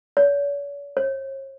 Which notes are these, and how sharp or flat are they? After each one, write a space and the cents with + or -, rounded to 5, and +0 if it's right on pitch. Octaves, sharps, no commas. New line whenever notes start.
C#5 +45
C#5 -45